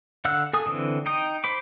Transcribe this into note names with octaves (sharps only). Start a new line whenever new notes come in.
D3 F5 F#5 E6 F#6
A4 G#5 D#6
D3 E3 C4
D#4 G5 D#6
C5 B5 D6